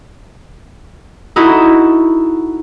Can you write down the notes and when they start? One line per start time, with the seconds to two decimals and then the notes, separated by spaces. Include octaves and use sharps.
1.36 D#4 E4 F#4 A4